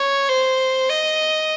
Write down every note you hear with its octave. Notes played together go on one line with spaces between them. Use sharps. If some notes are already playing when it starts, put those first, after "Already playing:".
Already playing: C#5
C5
D#5